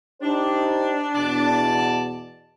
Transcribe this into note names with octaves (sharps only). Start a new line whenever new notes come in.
D4 D#4 G4 C5
E2 B2 D5 A5